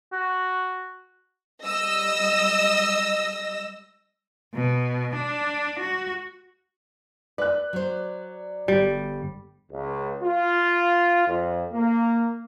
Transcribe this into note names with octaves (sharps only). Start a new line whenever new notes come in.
F#4
G3 D#5 E6 A#6
B2
D4
F#4
B4 D5 F#6
F#3 C5
G1 G3
C#2
F4
F2
A#3